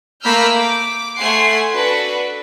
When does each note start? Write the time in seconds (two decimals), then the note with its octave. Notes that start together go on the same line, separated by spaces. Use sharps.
0.23 A3 A#3 B5 E6 F6 G6
0.56 D6
1.19 A3 F#5 G#5 C6 C7
1.70 D4 F#4 A4 B4